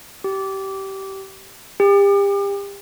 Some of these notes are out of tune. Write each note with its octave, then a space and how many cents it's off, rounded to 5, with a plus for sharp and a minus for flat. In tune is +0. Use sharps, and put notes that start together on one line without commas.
G4 -20
G4 +35